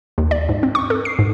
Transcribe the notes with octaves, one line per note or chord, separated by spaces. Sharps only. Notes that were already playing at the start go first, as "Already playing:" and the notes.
D#2
D5
G#2
C4
C#6
A4
C7
G#2